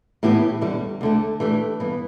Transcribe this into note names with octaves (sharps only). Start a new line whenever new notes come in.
A2 E3 B3 E4 G4
E2 D3 G3
D2 D3 A3
E3 A3 D4 G4
G2 E3 B3